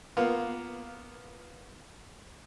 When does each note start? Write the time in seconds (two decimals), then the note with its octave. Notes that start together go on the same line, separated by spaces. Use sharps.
0.17 A#3 B3 F4